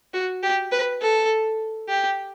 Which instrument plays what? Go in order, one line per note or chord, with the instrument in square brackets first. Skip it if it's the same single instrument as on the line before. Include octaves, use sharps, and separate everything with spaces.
[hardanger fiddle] F#4
G4
B4
A4
G4